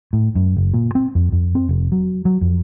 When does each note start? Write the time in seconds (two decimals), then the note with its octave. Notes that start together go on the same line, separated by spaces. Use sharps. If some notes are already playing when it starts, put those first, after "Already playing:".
0.13 A2
0.35 F#2
0.57 F#1
0.74 A#2
0.95 C4
1.15 F2
1.32 F2
1.55 C4
1.69 F1
1.92 F#3
2.25 F#3
2.41 F2